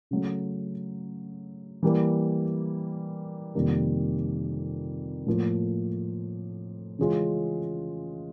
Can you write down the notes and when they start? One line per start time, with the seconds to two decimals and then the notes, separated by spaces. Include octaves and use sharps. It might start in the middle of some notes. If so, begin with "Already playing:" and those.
0.11 C#3 F#3 A3
1.83 E3 G3 A#3
3.55 F2 C3 D#3 G3 A#3
5.27 A2 F3 A#3
6.99 C#3 E3 G#3 C#4 F4